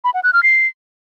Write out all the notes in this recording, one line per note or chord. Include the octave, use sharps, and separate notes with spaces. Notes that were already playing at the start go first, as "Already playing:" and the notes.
B5
F#5
F#6
F6
C7